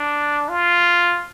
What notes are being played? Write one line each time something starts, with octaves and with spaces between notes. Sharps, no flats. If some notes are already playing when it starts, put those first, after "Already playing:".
Already playing: D4
F4